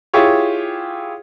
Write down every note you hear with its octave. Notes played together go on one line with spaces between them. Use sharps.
E4 F4 G4 G#4 C#5